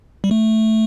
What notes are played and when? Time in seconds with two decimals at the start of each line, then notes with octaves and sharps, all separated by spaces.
0.24 G3
0.31 A3